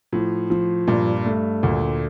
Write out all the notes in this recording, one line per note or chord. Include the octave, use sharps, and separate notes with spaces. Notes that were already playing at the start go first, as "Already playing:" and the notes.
A2 F3
F3
G2 A#2
A3
D2 A#2